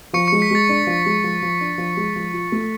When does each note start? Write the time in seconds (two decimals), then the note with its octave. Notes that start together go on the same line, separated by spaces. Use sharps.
0.13 F3 C#6 C#7
0.27 G#3 C#6 C#7
0.42 B6
0.51 G#3 A6
0.69 D4
0.87 F3
1.06 G#3
1.24 F3
1.42 F3
1.61 D4
1.78 F3
1.97 G#3
2.16 F3
2.33 F4
2.52 A3